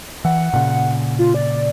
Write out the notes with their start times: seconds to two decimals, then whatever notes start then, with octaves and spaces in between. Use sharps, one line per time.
0.25 E3 F#5
0.53 A#2 C#3
1.19 F4
1.34 D5